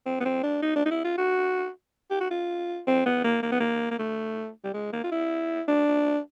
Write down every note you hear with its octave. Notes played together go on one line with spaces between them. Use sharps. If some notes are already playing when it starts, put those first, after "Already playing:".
C4
B3
C4
D4
D#4
D4
D#4
E4
F4
F#4
G4
F#4
F4
C4
B3
A#3
A#3
B3
A#3
A#3
A3
G3
G#3
A#3
F4
E4
D4